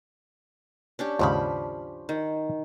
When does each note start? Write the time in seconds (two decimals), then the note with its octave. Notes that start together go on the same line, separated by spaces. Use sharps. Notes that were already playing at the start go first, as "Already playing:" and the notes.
0.99 C#4 D4 G4
1.19 D#2 G#2 C#3 F3 G4 B5
2.09 D#3